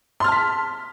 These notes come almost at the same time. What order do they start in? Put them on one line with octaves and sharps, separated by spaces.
C6 F6 A5 B6